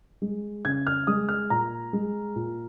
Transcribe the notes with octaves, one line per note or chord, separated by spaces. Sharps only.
G#3
C#3 G#6
F6
G#3 D#6
F6
A#2 A#5
G#3
A#2